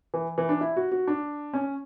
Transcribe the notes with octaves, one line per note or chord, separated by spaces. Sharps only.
E3
E3
D4
E4
F#4
F#4
D4
C#4